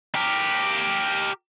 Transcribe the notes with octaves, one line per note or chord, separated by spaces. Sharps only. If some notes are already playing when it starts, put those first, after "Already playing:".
G4 A#4